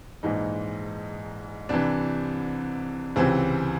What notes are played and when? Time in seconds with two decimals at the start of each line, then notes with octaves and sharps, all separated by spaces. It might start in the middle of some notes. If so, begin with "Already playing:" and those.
0.23 A#1 G#2 E3 D#4
1.69 C2 C3 E3 D4
3.16 C#2 C3 E3 C4